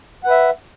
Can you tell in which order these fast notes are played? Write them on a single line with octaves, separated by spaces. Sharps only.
F#5 B4 E5